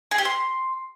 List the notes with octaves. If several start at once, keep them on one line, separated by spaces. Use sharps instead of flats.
G#4
G4
C6